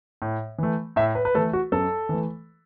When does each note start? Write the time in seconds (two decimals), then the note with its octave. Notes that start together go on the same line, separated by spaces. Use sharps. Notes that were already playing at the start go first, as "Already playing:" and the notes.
0.22 A2
0.58 E3 A3
0.96 A2 E5
1.15 B4
1.25 B4
1.35 E3 A3 A4
1.53 F#4
1.72 F#2 A4
2.09 E3 A3